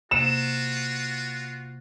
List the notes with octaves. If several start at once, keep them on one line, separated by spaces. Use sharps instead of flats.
C3 A#3 F4 F#4 E7